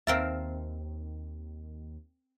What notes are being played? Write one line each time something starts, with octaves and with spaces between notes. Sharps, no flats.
D#2 C4 A#4 E5 F5 A5